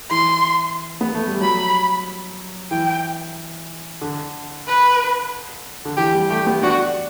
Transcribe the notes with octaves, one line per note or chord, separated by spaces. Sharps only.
E3 C6
B3
A3
G3
F#3 B5
E3 G5
D3
B4
D3
E3 G4
G3
A3 G4
B3
D4 F#4